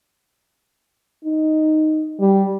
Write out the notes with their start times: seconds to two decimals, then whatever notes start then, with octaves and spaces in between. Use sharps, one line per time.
1.25 D#4
2.20 G3